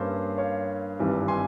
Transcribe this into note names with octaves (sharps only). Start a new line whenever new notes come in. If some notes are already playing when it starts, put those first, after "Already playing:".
Already playing: G2 G3 A#3 C#4 C5
C#5 F5
G#1 G2 E3 G3 C4
G#5 C6